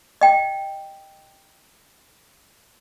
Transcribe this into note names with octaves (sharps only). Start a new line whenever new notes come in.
D#5 G5